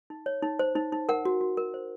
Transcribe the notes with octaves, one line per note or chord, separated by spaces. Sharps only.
D#4
C#5
D#4
C5
D#4
D#4
A#4 F#5
F#4
F#4
A#4
C5